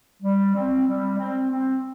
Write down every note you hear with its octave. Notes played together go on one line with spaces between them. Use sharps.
G3
C4
G3
C4
C4